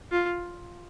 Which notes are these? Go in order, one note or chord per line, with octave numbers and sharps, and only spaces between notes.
F4